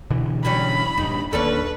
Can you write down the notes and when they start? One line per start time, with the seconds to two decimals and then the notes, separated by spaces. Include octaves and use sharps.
0.10 B2 D3 E3
0.45 F#3 G3 C#4 B5
0.98 D#1 G2 D#4
1.33 D#1 D#2 A#3 C#4 D4 A4 B4